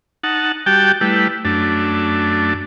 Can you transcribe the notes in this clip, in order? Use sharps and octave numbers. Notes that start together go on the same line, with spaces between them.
D#4 F#5 A5
G3 F#4 G4 G5 A5
G3 A3 E4 B4
F#2 A3 D4